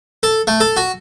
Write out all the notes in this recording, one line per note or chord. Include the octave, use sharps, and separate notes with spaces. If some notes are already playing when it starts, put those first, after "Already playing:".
A4
A3
A4
F#4